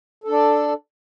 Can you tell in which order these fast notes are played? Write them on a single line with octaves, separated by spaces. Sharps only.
A4 D4 D5